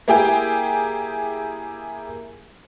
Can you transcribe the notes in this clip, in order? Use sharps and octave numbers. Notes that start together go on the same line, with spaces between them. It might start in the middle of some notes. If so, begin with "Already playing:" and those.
A#3 E4 G4 G#4 G5